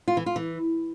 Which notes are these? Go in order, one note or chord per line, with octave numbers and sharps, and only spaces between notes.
F4
E3
F4
E3